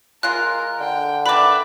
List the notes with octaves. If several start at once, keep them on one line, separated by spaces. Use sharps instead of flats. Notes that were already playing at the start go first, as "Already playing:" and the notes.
G#3 F4 A#4 F#6
D3 G5
D#3 B4 D5 E5 B5 D6